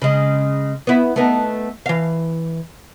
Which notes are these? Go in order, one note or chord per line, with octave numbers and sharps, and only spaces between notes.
C#3 G#3
B3 E4
A3 B3 D#4
E3 F5